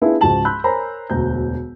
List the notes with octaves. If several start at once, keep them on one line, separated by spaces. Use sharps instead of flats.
B3 D4 E4 F4 G#4 B4
C#2 G#2 F3 F#4 A5 F#7
B5 C6 E6 F#6 G6
A#4 C5 C#5 G#5 A#5 B5
E1 D2 A#5 G6